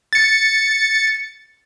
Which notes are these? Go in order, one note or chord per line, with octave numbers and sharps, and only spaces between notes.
A6 C#7